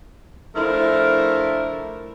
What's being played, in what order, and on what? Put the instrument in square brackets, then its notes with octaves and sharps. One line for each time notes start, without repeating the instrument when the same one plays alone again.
[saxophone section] F3 A3 D4 E4 A#4